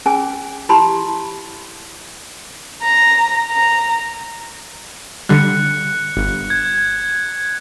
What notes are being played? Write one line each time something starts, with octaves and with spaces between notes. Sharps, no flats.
C#4 G#4 G#5
E4 G4 A5 B5 C6
A#5
A#5
D3 G3 F#6 C#7
G1
G#6